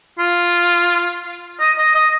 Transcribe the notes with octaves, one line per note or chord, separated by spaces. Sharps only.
F4
D#5
D#5
D#5